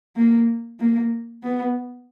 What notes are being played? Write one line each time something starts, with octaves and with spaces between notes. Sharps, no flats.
A#3
A#3
B3